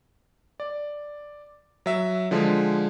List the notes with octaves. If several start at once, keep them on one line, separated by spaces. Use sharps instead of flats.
D5
F#3 E5
D3 F3 G#3